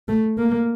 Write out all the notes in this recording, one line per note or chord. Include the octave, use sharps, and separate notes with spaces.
A3
A#3